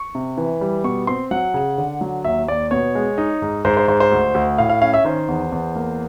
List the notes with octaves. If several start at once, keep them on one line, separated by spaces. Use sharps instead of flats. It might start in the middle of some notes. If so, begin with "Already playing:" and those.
Already playing: C#6
C3
E3
G3
B2 C#6
C4 C6
F#3 F#5
C#3
D3
F#3
D#2 E5
D#2 D5
B2 C#5
G#3
D#4
G#2
G#2 C5
C5
G#2 C5
C5
D2
D2
A2 F5
F5
C#4 F5
E5
D#3 C5
E2
E2
A#3